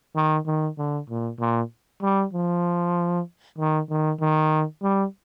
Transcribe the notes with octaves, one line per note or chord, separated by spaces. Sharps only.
D#3
D#3
D3
A#2
A#2
G3
F3
D#3
D#3
D#3
G3